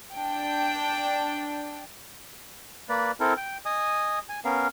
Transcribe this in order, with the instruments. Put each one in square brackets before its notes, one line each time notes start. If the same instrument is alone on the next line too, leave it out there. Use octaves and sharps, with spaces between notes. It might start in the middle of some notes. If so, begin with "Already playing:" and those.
[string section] D4 G5
[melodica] A#3 B4 D5
C4 E4 A4 A#4
G5
D#5 G#5 D#6
G#5
B3 C#4 A#4 F5